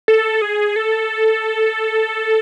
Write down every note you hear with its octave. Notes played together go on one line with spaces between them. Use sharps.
A4
G#4
A4